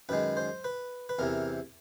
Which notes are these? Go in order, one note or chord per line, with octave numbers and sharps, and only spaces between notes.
F#2 D#3 G#3 B4
C5
B4
B4
E2 C3 E3 A#4